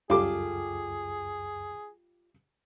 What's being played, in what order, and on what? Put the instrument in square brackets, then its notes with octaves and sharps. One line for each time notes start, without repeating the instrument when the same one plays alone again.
[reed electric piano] C#2 F#2 [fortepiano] G3 D6 [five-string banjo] F4 A4 [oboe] G#4